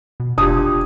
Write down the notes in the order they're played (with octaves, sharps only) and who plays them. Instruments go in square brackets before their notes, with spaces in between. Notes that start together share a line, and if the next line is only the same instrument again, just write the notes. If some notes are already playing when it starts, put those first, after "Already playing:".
[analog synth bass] B2
[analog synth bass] F1 [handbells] D4 F4 G4 [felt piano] D#6